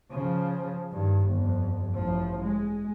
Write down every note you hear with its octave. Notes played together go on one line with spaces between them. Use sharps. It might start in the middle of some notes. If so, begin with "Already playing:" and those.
C#3 F3
G2 D#3
G1 F2
A1 F3
G#3